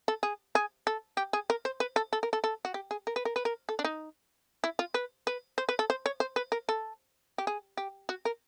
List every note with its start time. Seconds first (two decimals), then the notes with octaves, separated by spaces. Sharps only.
0.08 A4
0.23 G#4
0.55 G#4
0.87 A4
1.17 G4
1.33 G#4
1.50 A#4
1.65 C5
1.80 B4
1.96 A4
2.13 A4
2.23 A#4
2.33 A4
2.44 A4
2.65 F#4
2.74 G4
2.91 G#4
3.07 A#4
3.16 B4
3.25 A#4
3.36 B4
3.45 A#4
3.69 A4
3.79 D4
3.84 D#4
4.64 E4
4.79 F4
4.94 B4
5.27 B4
5.58 C5
5.69 B4
5.79 A4
5.90 C5
6.06 C#5
6.20 C5
6.36 B4
6.52 A#4
6.69 A4
7.38 G4
7.47 G#4
7.77 G4
8.09 F#4
8.25 A#4